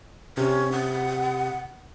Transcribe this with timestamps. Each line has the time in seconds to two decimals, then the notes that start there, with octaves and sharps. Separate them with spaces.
0.37 C3 C#4
0.72 F#5